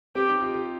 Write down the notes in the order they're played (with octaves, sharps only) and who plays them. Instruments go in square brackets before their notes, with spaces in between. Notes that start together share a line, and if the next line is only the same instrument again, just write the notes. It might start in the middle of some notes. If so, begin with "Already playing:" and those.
[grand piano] C4 [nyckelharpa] G4
[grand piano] D#4
G4
F4
G4